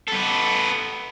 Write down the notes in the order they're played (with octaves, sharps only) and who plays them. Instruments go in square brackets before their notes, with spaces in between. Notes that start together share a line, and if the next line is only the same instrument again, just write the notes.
[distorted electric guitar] B3 A4